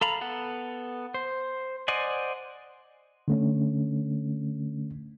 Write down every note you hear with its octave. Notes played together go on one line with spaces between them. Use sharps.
A4 F5 A#5 B5
B3 A4 F#5
C5
C5 D5 D#5 F#5 G#5
D3 A3 C#4